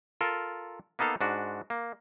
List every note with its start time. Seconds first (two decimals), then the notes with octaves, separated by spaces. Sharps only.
0.21 F4 A4 A#4
0.99 A#3 B3 D#4 A4 F5
1.21 G#2 D4 F#4
1.70 A#3